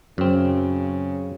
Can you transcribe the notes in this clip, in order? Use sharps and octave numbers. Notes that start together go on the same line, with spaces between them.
F#2 C#3 C4